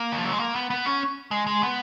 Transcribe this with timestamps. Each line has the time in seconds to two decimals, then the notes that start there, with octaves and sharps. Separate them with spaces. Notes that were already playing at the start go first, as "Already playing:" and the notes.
Already playing: A#3
0.12 D#3
0.18 F3
0.25 F#3
0.32 G#3
0.39 A#3
0.55 B3
0.70 B3
0.86 C#4
1.31 G#3
1.47 G#3
1.63 B3